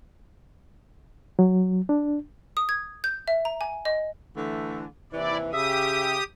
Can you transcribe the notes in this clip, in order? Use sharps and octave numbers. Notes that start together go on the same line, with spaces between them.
F#3
D4
D#6
G#6
G6
E5
A#5
G#5
D#5
D3 E3 A3
D#2 C3 E3 E4 D5
C#3 G4 E5 D#6